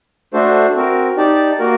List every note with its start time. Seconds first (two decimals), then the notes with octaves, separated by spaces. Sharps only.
0.33 A3 D4 F#4 A4 C5
0.75 C4 F#4 A#4
1.17 D#4 G4 D5 A5
1.59 A#3 F#4 A#4